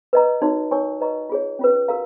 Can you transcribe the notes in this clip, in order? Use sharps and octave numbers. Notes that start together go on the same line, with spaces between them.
B4 D#5 A#5
D#4 F#4 A#4 C#5
D#4 A#4 C#5 G#5 C#6
B4 D#5 A#5 C#6
F4 G#4 C#5
C#4 F4 B4
F#4 A#4 F5 A#5